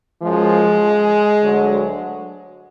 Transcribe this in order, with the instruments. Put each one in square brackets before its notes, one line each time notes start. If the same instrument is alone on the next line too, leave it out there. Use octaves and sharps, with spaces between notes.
[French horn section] F#2 F3 G#3
D2 D3 F#3